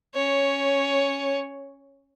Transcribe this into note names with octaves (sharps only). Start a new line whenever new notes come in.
C#4 C#5